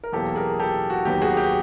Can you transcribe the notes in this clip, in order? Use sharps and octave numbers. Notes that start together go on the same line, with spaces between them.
A#4
E2 B2 F#3 A#3 G4 A4
G#4 A#4
G4 A4
F#4
D#2 D#3 F#3 B3 G4
F#4 G#4
G4